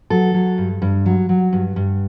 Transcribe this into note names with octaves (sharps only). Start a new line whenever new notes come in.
F#3 A4
F#3
G2
G2
F#3
F#3
G2
G2